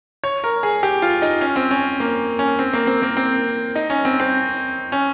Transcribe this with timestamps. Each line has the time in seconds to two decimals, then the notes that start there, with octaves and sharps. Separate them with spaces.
0.24 C#5
0.44 A#4
0.63 G#4
0.83 G4
1.02 F4
1.22 D#4
1.41 C#4
1.56 C4
1.71 C#4
2.00 A#3
2.39 C#4
2.59 C4
2.73 A#3
2.87 C4
3.02 A#3
3.17 C4
3.75 D#4
3.90 C#4
4.05 C4
4.20 C4
4.92 C#4